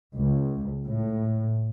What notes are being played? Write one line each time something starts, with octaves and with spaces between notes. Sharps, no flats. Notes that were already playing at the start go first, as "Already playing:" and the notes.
C#2
A2